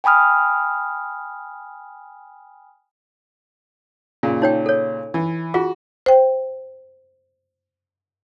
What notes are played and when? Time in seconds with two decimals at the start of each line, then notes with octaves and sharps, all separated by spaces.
0.04 G5 G#5 B5 D#6 F6
4.23 A#2 C#3
4.42 D#4 C#5 G5
4.66 A4 C#5
5.14 E3
5.54 F4 F#4 G#4
6.06 C5 G5